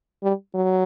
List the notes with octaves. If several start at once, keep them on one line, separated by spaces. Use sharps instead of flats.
G3
F#3